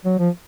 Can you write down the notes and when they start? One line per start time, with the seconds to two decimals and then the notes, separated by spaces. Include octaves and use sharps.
0.06 F#3
0.19 F3